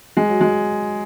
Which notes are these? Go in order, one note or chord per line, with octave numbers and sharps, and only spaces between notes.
G#3
F#3
G#3